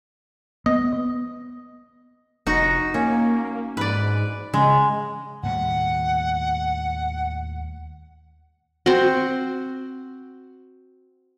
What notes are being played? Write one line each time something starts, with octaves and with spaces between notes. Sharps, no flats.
B3 D#5
F1 D#4 F#4
A#3 C#4
G#2 B4 D5
C#3 G#3
D#2 A2 G3 F#5
C4 F#4